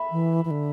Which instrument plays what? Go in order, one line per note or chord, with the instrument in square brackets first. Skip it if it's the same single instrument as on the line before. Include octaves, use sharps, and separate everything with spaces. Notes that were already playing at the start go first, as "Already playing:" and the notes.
Already playing: [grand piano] E5 B5
[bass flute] E3
E3
D3